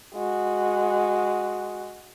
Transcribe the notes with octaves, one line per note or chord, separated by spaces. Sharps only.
G#3 F#4